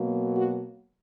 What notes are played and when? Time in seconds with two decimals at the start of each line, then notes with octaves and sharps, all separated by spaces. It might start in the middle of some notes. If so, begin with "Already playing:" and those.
Already playing: B2 F#3 A#3
0.33 F#4